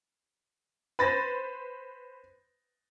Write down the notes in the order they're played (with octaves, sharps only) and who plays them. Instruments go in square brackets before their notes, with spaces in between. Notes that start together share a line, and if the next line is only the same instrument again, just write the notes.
[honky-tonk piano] B4 C5 [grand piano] B5 A6 A#6